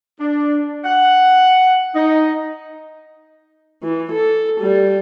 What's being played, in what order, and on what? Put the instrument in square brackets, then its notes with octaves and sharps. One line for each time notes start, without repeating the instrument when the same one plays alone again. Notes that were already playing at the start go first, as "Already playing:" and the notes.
[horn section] D4
F#5
D#4
[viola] E3
A4
G3